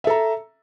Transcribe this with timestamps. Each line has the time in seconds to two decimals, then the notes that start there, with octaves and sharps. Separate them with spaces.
0.04 E5
0.07 A4
0.10 A#5